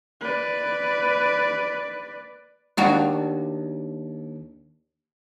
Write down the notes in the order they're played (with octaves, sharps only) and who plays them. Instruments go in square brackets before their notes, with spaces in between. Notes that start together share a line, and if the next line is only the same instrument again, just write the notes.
[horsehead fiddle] B4 D5
[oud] D#2 D4 F#4